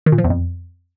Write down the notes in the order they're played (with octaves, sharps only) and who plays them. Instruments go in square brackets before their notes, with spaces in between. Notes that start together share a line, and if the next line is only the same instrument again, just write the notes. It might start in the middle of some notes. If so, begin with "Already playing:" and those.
[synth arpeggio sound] D#3
A#2
F3
E2
F2